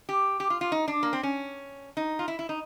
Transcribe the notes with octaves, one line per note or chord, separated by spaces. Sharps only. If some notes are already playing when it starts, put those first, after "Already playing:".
G4
G4
F4
F4
D#4
D4
A#3
C4
C#4
D#4
F4
E4
E4
D#4